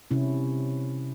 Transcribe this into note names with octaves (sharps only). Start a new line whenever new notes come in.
C3 C#4 E4